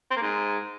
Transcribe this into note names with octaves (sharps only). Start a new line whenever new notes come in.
C4
A#3
G#2